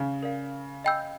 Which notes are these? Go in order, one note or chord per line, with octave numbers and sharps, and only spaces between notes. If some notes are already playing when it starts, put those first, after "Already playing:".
Already playing: C#3
A#4 D5 F5
D#5 G5 B5 E6 G6